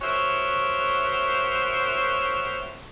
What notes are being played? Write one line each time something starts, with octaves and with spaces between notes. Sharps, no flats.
F#4 A#4 C5 C#5 E5 F#5